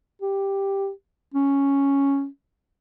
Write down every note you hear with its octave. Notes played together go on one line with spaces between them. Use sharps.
G4
C#4